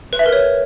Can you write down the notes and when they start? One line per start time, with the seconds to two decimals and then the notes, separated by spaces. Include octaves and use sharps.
0.13 B4
0.19 E5
0.26 A#4
0.32 C#5